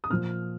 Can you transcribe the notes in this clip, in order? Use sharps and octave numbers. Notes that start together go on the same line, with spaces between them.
D#6
A#2 F3 F6